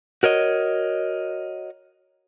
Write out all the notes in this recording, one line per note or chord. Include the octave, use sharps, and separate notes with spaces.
F#4 A#4 C#5 D#5